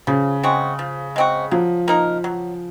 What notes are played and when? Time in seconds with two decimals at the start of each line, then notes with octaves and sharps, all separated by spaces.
0.07 C#3 F3
0.43 G#3 C4 F#4
0.79 F3
1.16 G#3 C4 F#4
1.51 F3 F#3
1.88 A#3 D#4 A#4
2.24 F#3